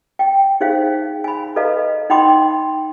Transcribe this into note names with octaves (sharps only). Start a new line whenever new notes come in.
G5
D#4 G#4 C5 F5
G#5 B5
A4 B4 D#5 F5 A#5
D#4 F#5 G5 B5 C6 D6